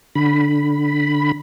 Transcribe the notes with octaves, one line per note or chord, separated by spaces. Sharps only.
D3 B5